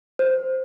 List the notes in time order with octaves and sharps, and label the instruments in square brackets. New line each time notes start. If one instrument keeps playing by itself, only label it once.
[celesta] C5